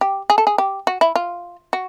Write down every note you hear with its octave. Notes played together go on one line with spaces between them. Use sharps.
G4
G#4
A4
G#4
G4
F#4
E4
F4
F#4